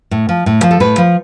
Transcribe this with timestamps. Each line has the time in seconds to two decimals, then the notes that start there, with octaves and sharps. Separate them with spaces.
0.11 A2
0.29 F3
0.46 A2
0.63 F3
0.71 A4
0.80 A2 B4
0.98 F3